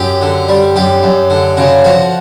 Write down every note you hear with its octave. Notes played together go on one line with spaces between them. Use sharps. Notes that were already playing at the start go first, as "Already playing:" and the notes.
Already playing: F#2 G4
D3
G3
F#2 G4
F#2
D3
C#3 F#4
F3 F#4